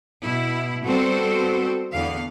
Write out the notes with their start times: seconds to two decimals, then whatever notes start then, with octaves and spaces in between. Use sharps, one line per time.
0.22 B2 E4
0.83 G3 B3 C4 F#4 A4 C5
1.92 E2 D3 B3 F5